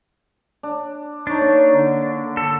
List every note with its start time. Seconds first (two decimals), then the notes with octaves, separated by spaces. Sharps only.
0.63 D4
1.27 D4 D#4 C5 C#5
1.41 A#3 C#5
1.75 D3
2.37 A4